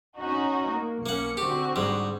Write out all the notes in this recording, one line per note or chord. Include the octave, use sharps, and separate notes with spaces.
C#4 D#4 F#4
A#3
B1 A#3 C#4 F#5 C#7
D3 C4 F#4 G4
G#2 G3